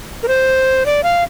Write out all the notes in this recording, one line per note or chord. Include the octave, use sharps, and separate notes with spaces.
A#4
C5
D5
F5